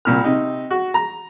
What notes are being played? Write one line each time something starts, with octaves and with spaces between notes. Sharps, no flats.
C2 A#2 F6
C3 D#4
F#4
A#5